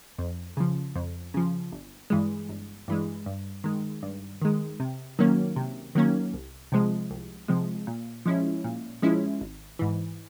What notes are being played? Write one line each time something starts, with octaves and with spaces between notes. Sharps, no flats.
F2
C#3 F3
F2
C#3 F3
G1
G2 E3 G#3
G1
G2 E3 G#3
G2
D#3 G#3
G2
D#3 G#3
C3
D#3 F#3 A#3 C#4
C3
D#3 F#3 A#3 C#4
C2
C3 F3 G#3
C2
C3 F3 G#3
A#2
F3 G#3 C#4 E4
A#2
F3 G#3 C#4 E4
G#1
G#2 E3